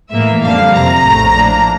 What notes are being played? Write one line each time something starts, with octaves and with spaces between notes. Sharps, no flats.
A2 E3 A#3 E5
F2 D3 G3 A#3 D4 F5
F2 C3 F3 A#5
A#1 A2 F3 A3
A2 F3 A#3 D4